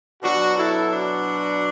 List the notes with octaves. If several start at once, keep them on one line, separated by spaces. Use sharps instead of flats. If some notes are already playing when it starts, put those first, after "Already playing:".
B2 F#3 D4 F#4
E4 A4
D4 F#4